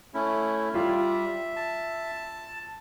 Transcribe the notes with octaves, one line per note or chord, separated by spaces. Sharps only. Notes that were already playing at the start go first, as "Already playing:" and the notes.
A3 C#4 E4
G3 F4 E5
A5